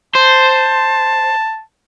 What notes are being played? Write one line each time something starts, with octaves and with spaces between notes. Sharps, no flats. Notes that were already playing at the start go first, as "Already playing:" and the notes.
C5 A5